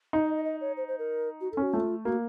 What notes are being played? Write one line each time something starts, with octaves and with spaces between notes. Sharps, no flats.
D#4
D#5
D#5
D#5
C#5
C5
C5
A#4
F#4
A4
C#4
F#4
A3 F4
A#3 F#4